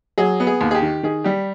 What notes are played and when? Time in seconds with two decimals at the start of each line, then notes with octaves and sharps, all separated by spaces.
0.18 F#3 G#4
0.40 B3
0.47 G#4
0.61 D#2
0.71 G#4
0.75 G4
0.82 D#3
1.03 D#3 G#4
1.24 G3 G4